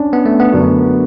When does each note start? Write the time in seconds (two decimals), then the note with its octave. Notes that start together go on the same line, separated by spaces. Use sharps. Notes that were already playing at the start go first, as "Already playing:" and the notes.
Already playing: C#4 D4
0.13 B3
0.26 A3
0.40 B3
0.52 F#2 D3 A3 D4 F#4